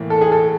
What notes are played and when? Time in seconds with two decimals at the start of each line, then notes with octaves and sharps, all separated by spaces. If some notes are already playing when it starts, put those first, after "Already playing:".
Already playing: A2 E3 A#3
0.10 A4
0.21 G#4
0.32 A4